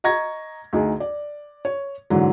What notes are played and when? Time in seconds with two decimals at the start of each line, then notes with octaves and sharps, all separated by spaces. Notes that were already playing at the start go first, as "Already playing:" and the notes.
0.04 D#5 A#5 C#6 G#6 A#6
0.73 D2 D#4 G#4
1.00 D5
1.65 C#5
2.10 G#2 D3 E3 F#3